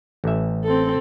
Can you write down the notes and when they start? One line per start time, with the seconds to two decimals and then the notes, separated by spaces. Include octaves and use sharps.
0.24 A1 E5
0.64 C4 A4